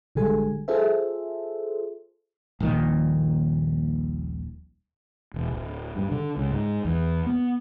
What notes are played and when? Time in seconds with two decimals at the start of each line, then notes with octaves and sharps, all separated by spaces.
0.15 A1 D3 G3 G#3 A4 G#5
0.68 F4 G#4 A4 C5 E5
2.60 D#1 A#1 A#2 D#3
5.34 E1
5.52 D1
5.96 G2
6.11 D3
6.37 C#2
6.51 G#2
6.85 E2
7.26 B3